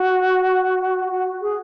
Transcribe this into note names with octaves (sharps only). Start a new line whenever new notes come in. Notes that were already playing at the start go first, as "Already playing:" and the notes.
Already playing: F#4
F#4
G#4